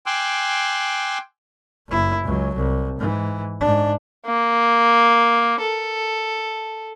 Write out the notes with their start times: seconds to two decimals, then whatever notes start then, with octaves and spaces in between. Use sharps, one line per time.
0.06 G5 G#5 C6 D6 E6 F#6
1.88 F#1 E4
2.23 C#2 F#3
2.56 C2
2.99 G#2 E3
3.61 G#2 D4
4.26 A#3
5.61 A4